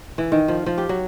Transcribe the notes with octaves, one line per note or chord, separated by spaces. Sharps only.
E3
D#3
F3
F3
G4
F#3